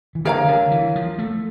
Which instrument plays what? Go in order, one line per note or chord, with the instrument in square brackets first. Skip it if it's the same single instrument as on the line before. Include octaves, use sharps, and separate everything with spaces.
[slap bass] E3
[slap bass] D3 [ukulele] A#4 C#5 F5 A#5
[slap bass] D3
E3
F3
A3